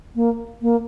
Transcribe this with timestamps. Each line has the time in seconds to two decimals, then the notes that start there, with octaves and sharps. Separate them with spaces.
0.16 A#3
0.62 A#3